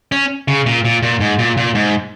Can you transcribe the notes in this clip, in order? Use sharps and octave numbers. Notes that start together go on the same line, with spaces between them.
C#4
C#3
A#2
A#2
A#2
G#2
A#2
A#2
G#2